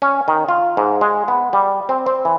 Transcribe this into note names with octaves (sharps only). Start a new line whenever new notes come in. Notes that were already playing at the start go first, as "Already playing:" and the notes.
C#4
D#3
F4
G#2
G#3
B3
G3
C4
C4
E3